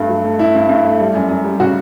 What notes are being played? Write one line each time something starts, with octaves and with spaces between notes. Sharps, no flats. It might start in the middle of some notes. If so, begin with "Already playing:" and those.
Already playing: G2 A3
F#3
A3
A3 E4
G2
G2
A3
G3
F#2
F#2
G3
C#3 F#4